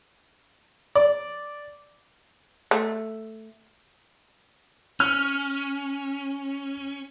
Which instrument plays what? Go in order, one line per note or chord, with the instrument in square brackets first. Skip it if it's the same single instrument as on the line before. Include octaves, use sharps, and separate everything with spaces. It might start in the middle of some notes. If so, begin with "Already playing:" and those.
[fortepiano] D5
[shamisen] A3
[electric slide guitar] C#4 [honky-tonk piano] F6